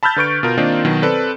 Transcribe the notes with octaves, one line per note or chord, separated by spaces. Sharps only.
A5 B5 E6 F6 G6 A6
D3 B4 C#6 D7
B2 F4 A#4
D#3 A#3 C4 D4 D#4 F4
B2 D#3 F#3
C4 A4 B4 D5